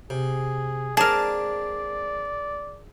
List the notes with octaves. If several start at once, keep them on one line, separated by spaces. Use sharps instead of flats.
C3 G#4
G#3 C4 D4 G#4 A#4 D5 A5